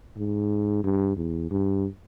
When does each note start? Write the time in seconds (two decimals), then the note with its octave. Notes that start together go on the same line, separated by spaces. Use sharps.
0.17 G#2
0.84 G2
1.17 E2
1.51 G2